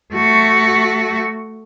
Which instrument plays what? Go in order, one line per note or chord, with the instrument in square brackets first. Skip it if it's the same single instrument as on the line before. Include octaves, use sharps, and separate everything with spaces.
[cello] A3 F#4